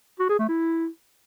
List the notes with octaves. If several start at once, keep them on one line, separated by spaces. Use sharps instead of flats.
F#4
G#4
A3
E4